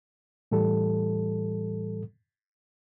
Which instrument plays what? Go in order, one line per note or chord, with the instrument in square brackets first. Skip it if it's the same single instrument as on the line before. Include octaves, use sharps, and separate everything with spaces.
[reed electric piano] A2 E3 G3 A4